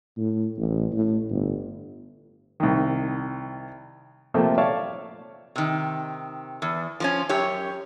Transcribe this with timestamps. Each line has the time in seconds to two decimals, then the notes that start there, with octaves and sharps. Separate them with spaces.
0.18 A2
0.58 A1
0.92 A2
1.31 G1
2.60 C2 D#3
4.34 C3 F3 A3 A#3
4.58 C#5 D5 E5 F5 A5 C#6
5.56 C3 D#3
6.62 E2
7.00 F3 C4 C#4
7.29 F#2 G4 C#5